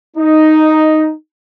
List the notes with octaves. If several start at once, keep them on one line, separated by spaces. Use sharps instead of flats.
D#4